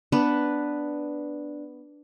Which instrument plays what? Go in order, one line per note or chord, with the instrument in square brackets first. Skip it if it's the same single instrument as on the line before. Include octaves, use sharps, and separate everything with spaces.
[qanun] B3 D4 B4